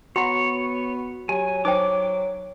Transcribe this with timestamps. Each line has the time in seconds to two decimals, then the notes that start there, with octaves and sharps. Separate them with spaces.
0.16 B3 F#4 C#5 F#5 A#5 C6
1.29 F#3 G4 G#5
1.65 F#3 D#4 C5 G5 D6